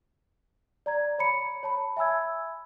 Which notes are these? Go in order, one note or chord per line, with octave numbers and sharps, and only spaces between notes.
D5 A#5 G#6
C#5 A#5 B5 C#7
C#5 A5 B5
E5 G#5 B5 E6 G#6